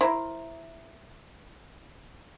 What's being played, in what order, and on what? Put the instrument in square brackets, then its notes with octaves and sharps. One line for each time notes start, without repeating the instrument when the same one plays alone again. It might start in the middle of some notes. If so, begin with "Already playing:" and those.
[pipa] E4 A#4 C5